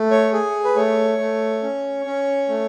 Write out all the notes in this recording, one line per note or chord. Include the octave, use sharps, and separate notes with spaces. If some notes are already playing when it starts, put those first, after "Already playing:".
Already playing: A3
C#5
G#4
B4
A3 C#5
A3
C#4
C#4
A3